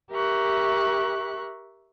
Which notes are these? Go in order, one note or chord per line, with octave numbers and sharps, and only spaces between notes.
G4 A#4 E5 C#6 F#6